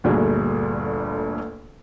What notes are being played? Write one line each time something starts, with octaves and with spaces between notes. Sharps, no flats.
G1 D2 A#2 F#4 G#4